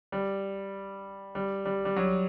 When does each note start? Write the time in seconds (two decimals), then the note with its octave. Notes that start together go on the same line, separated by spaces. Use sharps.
0.12 G3
1.35 G3
1.65 G3
1.85 G3
1.96 F#3